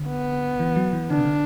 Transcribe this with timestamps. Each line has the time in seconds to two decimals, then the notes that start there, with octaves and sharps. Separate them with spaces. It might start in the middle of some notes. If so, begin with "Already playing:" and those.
Already playing: D3
0.08 B3
0.60 E3
0.76 F#3
0.93 E3
1.10 D3 D4
1.18 C3
1.25 D3